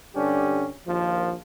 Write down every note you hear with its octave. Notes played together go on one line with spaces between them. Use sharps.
G2 D3 C#4 D4 G4
A#1 D#2 F3